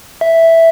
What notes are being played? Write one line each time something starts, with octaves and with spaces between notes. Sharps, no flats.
E5